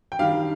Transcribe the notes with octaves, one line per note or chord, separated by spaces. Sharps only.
G5
D#3 G3 D4 F5